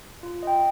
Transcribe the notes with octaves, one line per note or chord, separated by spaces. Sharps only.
F4
D#5 G5